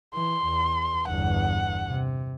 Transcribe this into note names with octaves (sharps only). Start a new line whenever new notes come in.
E3 C6
E2
G1 E2 F#5
C3